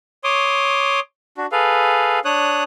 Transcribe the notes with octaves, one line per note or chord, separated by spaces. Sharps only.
C#5 C6 D6 D#6
D4 F#4
G#4 A4 B4 F5
D4 C#5 D#6 F#6